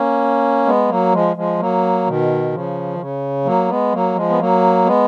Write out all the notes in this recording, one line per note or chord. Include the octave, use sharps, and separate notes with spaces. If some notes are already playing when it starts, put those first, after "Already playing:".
Already playing: A#3 C#4
G#3 B3
F#3 A#3
F3 G#3
F3 G#3
F#3 A#3
B2 D#3
C#3 F3
D#3
C#3
F#3 A#3
G#3 B3
F#3 A#3
F3 G#3
B3
F#3 A#3
G#3 B3